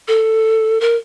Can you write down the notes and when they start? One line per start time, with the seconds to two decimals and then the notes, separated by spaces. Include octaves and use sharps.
0.08 A4
0.81 A#4